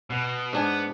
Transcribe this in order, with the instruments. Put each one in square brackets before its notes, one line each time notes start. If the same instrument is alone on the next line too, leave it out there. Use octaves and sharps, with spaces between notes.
[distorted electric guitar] B2
[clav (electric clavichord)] G#2 D4 G#5 [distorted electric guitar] B3